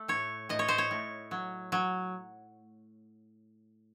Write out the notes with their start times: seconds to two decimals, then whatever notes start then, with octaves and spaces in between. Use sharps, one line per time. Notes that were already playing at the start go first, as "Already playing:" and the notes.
Already playing: A3
0.08 A2 C#5
0.49 A2 D#5
0.59 C#5
0.68 C5
0.78 C#5
0.91 A2
1.31 F#3
1.72 F#3